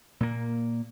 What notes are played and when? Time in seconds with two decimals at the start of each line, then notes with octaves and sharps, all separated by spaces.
0.20 A#2 A#3